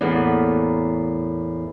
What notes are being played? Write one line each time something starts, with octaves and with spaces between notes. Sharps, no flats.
E2 A2 A#3 B3